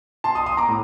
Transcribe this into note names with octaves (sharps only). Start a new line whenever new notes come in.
A5 C6
C6 D#6
C6 D#6
A#5 D6
A2